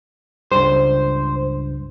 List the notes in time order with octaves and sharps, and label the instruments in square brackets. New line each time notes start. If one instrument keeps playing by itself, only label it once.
[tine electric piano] C#2 G2 [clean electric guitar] C5